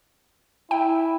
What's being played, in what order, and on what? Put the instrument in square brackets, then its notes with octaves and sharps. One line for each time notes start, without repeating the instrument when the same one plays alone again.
[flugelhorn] E4 [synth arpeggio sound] G5